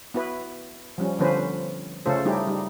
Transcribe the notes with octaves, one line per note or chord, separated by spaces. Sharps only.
B3 E4 F#4 B4
F3 G3 C#4
D3 F3 B3 C#4 B4 C5
C#3 A3 C#4 F4 A4 C5
G3 A3 D#4 E4 G4 G#4
G3 D#4